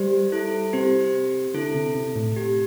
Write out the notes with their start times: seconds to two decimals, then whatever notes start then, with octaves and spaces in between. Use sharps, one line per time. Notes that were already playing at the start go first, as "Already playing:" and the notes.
Already playing: G3 G4 C5
0.32 E4 A4
0.73 C3 G4 C5
1.54 D3 E4 A4
1.74 C3
1.95 C3
2.15 A2
2.36 G4